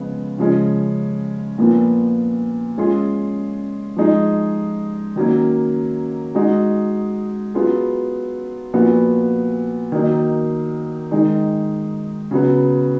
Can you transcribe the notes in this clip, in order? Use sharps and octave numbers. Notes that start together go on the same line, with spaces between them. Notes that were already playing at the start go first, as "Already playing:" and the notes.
Already playing: C#3 F3 G#3 B3
C#3 F3 G#3 C#4
A#2 F3 B3
G#3 C#4 F4 G#4
F3 G#3 D#4 G#4
D#3 F#3 A#3 C#4
G#3 D#4 F#4
F#3 B3 F4 G#4
A#2 F3 B3 F#4
D#3 F#3 A#3 D#4
D#3 G#3 D#4
C#3 F#3 B3